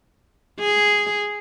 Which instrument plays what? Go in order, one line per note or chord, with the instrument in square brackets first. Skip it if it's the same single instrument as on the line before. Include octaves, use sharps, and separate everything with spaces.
[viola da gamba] G#4